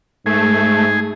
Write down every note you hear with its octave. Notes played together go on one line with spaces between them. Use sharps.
G#2 A3 G#4